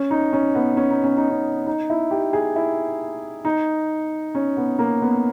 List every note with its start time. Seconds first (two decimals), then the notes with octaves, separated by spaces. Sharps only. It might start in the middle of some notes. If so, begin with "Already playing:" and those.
Already playing: C#4
0.11 D#4
0.33 C#4
0.55 B3
0.77 C#4
0.90 D#4
1.04 C#4
1.17 D#4
1.30 C#4
1.67 D#4
1.90 E4
2.11 G4
2.33 G#4
2.56 E4
3.45 D#4
4.35 C#4
4.57 B3
4.79 A#3
5.02 B3